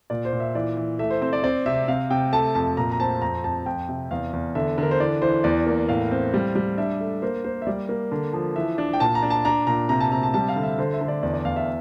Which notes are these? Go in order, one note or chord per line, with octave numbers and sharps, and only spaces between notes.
A#2 D5
C5
A#2
E5
E3 D5
E3
A3 E5
C5
C4 C5
D5
C4 D5
C3 E5
C3 F5
C3 G5
A3 A5
F2 A5
A#2 A#5
A#5
C4 A5
F2 A#5
F2 A5
F2 G5
C3
E2 F5
E2
D3 E5
D3 A#4
C5
E3 D5
E3 C5
E2 D5
A#3
A2 F5
C4
G3
G3
D4 E5
A3
A#3 C5
A#3 C5
E5
G3 D5
A#3
D3
F3
E3 E5
D4
G5
A#2 A5
A#5
D4
A5
D4 A#5
A#2 A#5
C3 A#5
A5
C3 A#5
A5
G3 A5
F5
D3
E5
D3 C5
E5
D3
D5
E2 D5
D5
E2 F5
E5